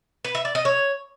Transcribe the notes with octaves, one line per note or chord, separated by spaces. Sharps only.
B4
E5
D5
D#5
C#5